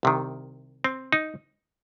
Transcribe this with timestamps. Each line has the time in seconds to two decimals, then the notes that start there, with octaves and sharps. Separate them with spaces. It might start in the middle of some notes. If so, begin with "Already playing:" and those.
0.03 C2 C3 D#3
0.84 C4
1.13 D#4